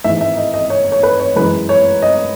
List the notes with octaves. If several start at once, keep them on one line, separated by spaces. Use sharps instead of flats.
G#1 G#2 E3 G#3 E5
E5
D#5
D#5
C#5
C#5
B4
C#5
F#2 E3 G#3 B4
C#5
D#5